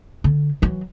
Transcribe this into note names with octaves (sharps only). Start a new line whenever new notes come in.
D3
E3 F#3